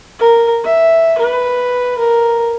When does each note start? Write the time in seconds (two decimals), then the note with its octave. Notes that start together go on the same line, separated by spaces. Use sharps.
0.20 A#4
0.64 E5
1.18 B4
1.98 A#4